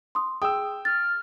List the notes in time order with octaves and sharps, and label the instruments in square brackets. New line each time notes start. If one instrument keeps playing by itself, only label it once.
[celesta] C6 D#6
[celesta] G#4 D#6 [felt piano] G5 E6
[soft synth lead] F6 [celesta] A6